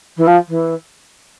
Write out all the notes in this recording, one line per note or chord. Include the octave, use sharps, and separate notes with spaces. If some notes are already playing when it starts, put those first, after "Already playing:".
E3
F3
E3